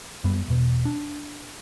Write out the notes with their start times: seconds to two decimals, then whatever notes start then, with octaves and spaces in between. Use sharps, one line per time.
0.24 F#2 G3 B3
0.48 E1 B2
0.85 D4